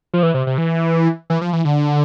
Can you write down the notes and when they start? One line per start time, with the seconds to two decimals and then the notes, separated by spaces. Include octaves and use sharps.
0.13 F3
0.23 E3
0.34 C3
0.47 C3
0.58 E3
1.30 E3
1.41 F3
1.53 E3
1.65 D3